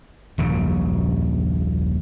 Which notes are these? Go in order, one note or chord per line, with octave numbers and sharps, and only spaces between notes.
D#1 A#1 F#2 C#3